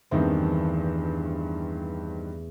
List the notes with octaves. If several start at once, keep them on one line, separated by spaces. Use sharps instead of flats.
E2 G2 D#3 A3 C4